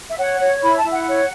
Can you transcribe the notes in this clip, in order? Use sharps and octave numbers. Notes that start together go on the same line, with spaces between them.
E5
C#5 F#5
C#5
E4 B5
A5
E4
F#5
C#5